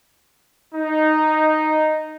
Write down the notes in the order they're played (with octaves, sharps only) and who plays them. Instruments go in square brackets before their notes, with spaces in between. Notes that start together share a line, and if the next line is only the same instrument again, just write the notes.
[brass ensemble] D#4